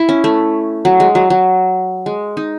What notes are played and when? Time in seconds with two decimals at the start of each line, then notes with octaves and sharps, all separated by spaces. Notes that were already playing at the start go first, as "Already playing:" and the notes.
Already playing: E4
0.09 C#4
0.24 A3
0.85 F#3
1.00 G#3
1.15 F#3
1.30 F#3
2.06 G#3
2.37 D#4